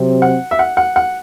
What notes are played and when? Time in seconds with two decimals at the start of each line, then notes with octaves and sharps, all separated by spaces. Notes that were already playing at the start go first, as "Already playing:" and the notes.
Already playing: C3 F#3 C4
0.22 F#5
0.51 E5
0.59 F#5
0.77 F#5
0.96 F#5